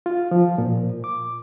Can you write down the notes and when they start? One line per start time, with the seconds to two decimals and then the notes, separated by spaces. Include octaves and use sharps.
0.06 F4
0.31 F3
0.58 A#2
1.04 D6